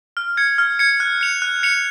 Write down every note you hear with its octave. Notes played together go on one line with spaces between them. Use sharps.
F6
G#6 C#7
F6
G#6 C#7
F#6
C#7 F7
F#6
C#7 F7